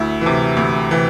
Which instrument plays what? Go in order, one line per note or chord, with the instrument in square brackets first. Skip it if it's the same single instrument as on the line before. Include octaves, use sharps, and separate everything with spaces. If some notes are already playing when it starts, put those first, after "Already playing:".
Already playing: [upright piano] D2 E4
C3 E3
D2
C3 E3